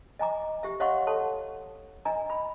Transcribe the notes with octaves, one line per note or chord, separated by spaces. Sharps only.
D#5 G#5 A#5 D6
G4 E5
C#5 D#5 F5 F#5 C6 C#6
A4 C#5 A5 C6
D4 D#5 G#5 A#5
B5